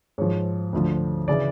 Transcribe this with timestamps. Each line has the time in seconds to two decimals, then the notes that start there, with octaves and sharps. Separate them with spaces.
0.18 G#2 F3 C#5
0.73 D2 D3 F3
1.28 C#3 E3 D5